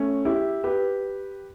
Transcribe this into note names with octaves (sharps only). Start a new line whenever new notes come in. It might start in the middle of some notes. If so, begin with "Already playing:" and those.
Already playing: A3 C#4
E4 G4
G4 B4